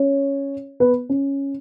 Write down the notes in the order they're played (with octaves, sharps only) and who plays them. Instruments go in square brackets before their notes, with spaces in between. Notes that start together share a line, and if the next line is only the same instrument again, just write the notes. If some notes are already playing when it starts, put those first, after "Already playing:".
Already playing: [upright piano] C#4 C#5
B3 B4
C#4